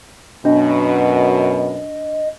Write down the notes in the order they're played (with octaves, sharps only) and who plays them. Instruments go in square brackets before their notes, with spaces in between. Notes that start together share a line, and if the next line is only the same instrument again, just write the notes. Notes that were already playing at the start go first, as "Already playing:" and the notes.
[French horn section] F#2 B2 [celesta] D4 [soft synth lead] D#5